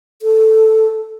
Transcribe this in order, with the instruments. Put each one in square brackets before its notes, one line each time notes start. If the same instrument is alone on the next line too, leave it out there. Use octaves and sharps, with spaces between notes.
[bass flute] A4